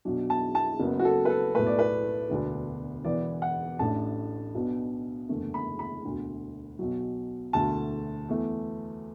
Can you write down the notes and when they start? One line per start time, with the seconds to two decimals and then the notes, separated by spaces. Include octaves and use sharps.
0.05 B1 B2 F#3 D4
0.30 A5
0.55 A5
0.80 F#1 F#2 F#3 B3
0.99 F#4
1.05 A4
1.25 B4
1.30 A4
1.54 B1 A2 A3 B4
1.67 D5
1.79 B4
2.30 E1 D2 D3 B3 D4
3.05 E1 E2 E3 B3 D5
3.42 F#5
3.79 A1 A2 A3 D4 A5
4.55 B1 B2 B3 D4
5.29 F#1 E2 D3 A3
5.54 B5
5.79 B5
6.04 E1 D2 D3
6.79 B1 B2 F#3
7.53 E1 D2 D3 A3 A5
8.29 E2 E3 A3